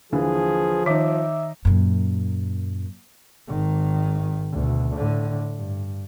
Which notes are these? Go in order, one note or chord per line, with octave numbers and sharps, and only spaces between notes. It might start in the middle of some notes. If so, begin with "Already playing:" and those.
D#2 D3 E3 F3 G#4
D#3 D#4 E5 D6
F#2 A#2
G#1 D#3
D2 B2
A2 D3
G2